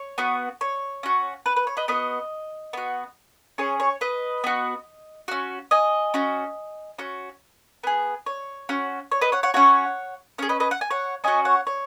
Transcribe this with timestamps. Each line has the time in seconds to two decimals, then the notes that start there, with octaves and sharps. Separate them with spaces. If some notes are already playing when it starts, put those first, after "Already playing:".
Already playing: C#5
0.18 B3 F#4
0.61 C#5
1.03 C#4 F#4
1.46 B4
1.56 B4
1.67 C#5
1.77 B4 D#5
1.88 B3 F#4 B4 D#5
2.73 B3 F#4
3.58 C#4 G#4 C#5
3.80 C#5
4.01 B4 D#5
4.44 B3 F#4
5.28 C#4 F#4
5.71 D#5 G#5
6.14 C#4 F#4
6.98 C#4 F#4
7.83 B3 G#4
8.26 C#5
8.69 C#4 F#4
9.12 C#5
9.21 B4 D#5
9.32 C#5 F#5
9.43 C#5 F#5
9.54 C#4 F#4 C#5 F#5
10.38 C#4 G#4 C#5
10.49 B4 D#5
10.60 B4 D#5
10.71 F#5
10.81 G#5
10.91 C#5 F#5
11.24 C#4 F#4 D#5 G#5
11.45 C#5 F#5
11.67 C#5